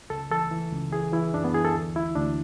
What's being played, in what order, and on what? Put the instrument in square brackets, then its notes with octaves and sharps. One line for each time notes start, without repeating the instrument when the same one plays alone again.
[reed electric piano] C#2 A4
E3 A4
E3
C#2
E3 G#4
E3 E4
F#2 D4
B3
E3 G#4
A4
D2
D2 E4
D2 D4